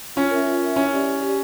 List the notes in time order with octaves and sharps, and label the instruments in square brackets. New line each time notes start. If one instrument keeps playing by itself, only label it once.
[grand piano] C#4 [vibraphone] F4
[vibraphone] A#4 E5
F4
A#4 E5
[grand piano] C#4 [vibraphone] E4
[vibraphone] G4 D5
E4
G4 D5